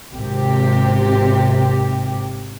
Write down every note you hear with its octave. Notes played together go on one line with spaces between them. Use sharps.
G#1 C3 G4